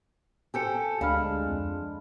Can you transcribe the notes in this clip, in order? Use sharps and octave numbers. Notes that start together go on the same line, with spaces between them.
G4 A4 C5 G#5 G6 C#7
D2 G#3 D4 F5 B5 F6
F2